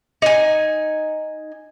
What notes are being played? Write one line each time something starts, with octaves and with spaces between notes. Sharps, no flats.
D#4 G#5